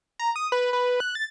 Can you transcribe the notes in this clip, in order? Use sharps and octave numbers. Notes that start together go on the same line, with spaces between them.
A#5
D#6
B4
B4
F#6
A6